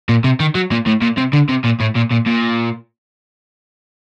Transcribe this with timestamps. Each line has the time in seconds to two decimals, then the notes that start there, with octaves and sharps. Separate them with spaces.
0.09 A#2
0.24 C3
0.40 D#3
0.55 F#3
0.71 A#2
0.87 A2
1.02 A#2
1.18 C3
1.33 D3
1.49 C3
1.64 A#2
1.80 A2
1.95 A#2
2.11 A#2
2.26 A#2